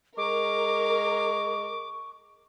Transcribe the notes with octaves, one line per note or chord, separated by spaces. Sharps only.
G#3 A#4 C#6 D6